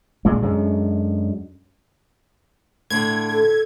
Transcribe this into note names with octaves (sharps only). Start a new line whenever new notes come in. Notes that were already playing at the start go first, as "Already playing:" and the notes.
A#2 C#3 G#3
F#2 D3 G#3
A2 D3 G#6
A4